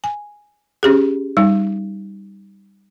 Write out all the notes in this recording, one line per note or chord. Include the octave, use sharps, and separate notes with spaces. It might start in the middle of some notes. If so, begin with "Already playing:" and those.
G#5
C#4 G4 G#4
G3 D#4